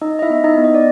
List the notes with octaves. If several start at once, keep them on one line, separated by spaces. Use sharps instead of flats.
D#4 D#5
D#5
E4 E5
B3
D#4 D#5
B3
D#5
D5